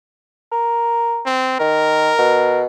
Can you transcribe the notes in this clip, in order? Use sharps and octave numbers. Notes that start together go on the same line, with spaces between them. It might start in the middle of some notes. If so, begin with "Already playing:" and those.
A#4
C4
D#3 A#4
B2